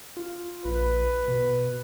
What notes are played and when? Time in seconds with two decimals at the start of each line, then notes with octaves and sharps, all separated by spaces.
0.17 F4
0.65 A#1 B4
1.28 B2